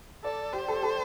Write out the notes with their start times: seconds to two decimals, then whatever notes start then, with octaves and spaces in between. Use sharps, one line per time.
0.24 A4 D5
0.53 G4 C5
0.68 A4
0.83 A4